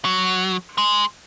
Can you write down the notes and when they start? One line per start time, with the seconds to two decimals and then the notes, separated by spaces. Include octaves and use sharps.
0.05 F#3
0.78 G#3